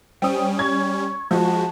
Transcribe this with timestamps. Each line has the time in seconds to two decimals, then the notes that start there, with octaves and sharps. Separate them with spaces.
0.22 G3 C#4 C5 G5 D#6
0.59 C#6 G#6
1.31 F3 G#3 F#4 A5